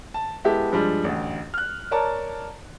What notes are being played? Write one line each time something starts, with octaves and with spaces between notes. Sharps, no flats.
A5
G#3 B3 E4 G4 A4
G2 F3 G3 G#3
A1 D2
F6 F#6
A#4 C#5 D5 A5 A#5